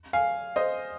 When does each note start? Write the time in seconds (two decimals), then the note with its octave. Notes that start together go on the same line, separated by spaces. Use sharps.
0.13 F5 G#5
0.56 C5 D#5